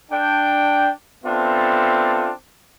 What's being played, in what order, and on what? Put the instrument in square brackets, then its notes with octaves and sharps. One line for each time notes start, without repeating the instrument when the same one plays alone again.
[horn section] D4 G5
B3 C4 D4 F4 A4 E5